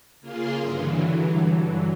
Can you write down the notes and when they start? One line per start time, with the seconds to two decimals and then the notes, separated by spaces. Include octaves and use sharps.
0.21 C#3 A#3 F4 G#4 F5 C6
0.61 G2 D3 E3 F#3